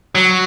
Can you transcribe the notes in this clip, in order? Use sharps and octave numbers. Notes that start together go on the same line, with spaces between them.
F#3